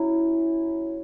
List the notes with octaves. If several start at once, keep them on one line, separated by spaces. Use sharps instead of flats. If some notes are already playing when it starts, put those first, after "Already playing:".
Already playing: F#3 C#4 E4